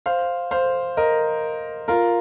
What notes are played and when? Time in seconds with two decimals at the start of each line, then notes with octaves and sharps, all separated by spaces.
0.06 C5 F5
0.51 C5 F5
0.97 A#4 D#5
1.88 F4 A#4